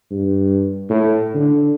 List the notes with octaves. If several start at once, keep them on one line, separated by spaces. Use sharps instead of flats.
G2
A2
D3